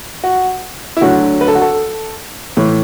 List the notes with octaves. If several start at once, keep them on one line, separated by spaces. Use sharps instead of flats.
F#4
E4
D2 D3 F#3 F#4
B4
A4
F#4
A4
A2 E3